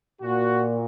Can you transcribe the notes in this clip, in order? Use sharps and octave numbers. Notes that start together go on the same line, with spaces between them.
A#2 F#4